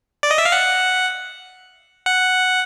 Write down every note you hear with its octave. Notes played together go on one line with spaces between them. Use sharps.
D5
D#5
E5
F5
F#5
F#5